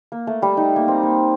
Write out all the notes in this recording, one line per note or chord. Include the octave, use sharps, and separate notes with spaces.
A#3
A3
G3
D#4
A#3
C4
A#3